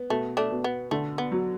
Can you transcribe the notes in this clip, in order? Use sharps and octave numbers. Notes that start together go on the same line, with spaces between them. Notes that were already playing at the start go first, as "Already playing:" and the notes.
Already playing: B3
B2 A3
A3 D4
B2
B3
D3 A3
B3
F#3